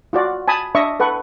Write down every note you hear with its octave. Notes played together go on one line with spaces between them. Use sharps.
F4 F#4 D5
G#5 A5 B5 D#6
D4 D#5 E5 C#6
A4 B4 F#5 C#6